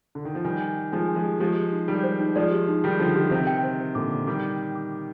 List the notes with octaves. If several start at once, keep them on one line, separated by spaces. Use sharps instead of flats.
D3
D#3
F3
D#3 G3 G#5
G#5
G#5
F3 G#3 G#5
G#5
F3 G#3
G4
F3 G#3 G4
G4
D#4
D#3 G3 G4
C5
D#4
F3 G#3 D5
G4
D#4
D#3 G3 G4
D3 F3 D#4
G4
C3 D#3 C5
G5
C5
C5
A#2 D3 D6
D6
D#3 G3 D6
G5
G5
D6
D6